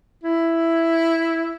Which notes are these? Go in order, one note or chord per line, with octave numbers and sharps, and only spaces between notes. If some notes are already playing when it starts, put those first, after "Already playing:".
E4